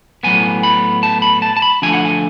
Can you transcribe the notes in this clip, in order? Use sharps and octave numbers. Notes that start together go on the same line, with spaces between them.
A2 F#3 B3 G#5
B5
A5
B5
A5
A5
B5
D3 F3 A3 D4 G#5
F#5
G#5